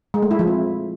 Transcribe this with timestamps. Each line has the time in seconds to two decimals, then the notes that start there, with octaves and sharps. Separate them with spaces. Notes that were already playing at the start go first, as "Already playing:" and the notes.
0.14 G#3
0.22 A3
0.31 E4
0.39 F3
0.48 C4